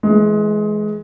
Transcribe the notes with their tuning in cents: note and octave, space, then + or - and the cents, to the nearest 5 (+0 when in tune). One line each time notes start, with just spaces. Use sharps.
E3 +0 G#3 +20